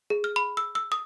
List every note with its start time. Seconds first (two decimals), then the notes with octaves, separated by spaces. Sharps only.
0.10 G#4
0.24 F6
0.36 B5
0.57 E6
0.75 E6
0.92 D#6